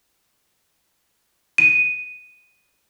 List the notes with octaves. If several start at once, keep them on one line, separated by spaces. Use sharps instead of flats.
D#7